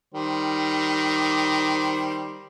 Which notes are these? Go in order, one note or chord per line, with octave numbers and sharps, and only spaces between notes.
D#3 G3 C5